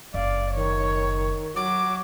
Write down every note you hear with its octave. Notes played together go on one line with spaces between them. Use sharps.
F#1 D5 F5
D#3 C#5
F#3 D6